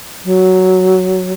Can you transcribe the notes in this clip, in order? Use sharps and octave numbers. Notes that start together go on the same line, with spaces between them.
F#3